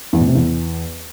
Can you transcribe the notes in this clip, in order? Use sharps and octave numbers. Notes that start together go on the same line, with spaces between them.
E2
A2
C3
E2